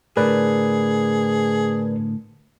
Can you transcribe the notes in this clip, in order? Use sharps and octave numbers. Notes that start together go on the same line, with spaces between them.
A2 D3 G#4 A#4 B4 D5